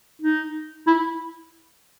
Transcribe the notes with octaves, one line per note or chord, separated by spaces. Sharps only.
D#4
E4